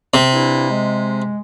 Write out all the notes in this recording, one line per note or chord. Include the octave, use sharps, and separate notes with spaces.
C3
G2 D4 E4
G#3